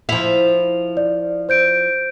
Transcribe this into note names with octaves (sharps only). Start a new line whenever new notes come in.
F3 E4 F7
D5
C5 G6 D7